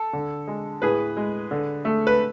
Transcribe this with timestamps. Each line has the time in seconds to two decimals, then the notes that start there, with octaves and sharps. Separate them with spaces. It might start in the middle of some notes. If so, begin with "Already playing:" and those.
Already playing: A4
0.13 D3
0.48 G#3
0.82 A2 G#4 B4
1.17 G#3
1.51 D3
1.85 A3
2.07 B4